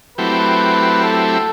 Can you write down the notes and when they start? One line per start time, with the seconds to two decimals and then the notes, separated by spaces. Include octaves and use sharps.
0.18 F#3 A3 C4 E4 G4 B4
1.04 A4